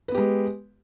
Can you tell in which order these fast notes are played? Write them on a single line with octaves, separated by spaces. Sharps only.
B4 B3 G4 G#3